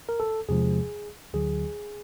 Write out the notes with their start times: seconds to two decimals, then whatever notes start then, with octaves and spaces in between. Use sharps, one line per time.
0.09 A#4
0.20 A4
0.49 E2 C3 F3 G#3 G#4
1.33 D2 D3 F#3 G#4